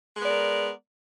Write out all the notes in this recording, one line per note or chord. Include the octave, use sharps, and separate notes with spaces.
G#3 B3 A#4 D5